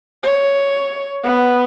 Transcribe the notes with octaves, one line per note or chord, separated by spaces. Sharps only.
C#5
B3